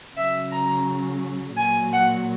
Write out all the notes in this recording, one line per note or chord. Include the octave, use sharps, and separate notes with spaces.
C#3 F#3 E5
A#5
A#2 F#3 G#5
F#5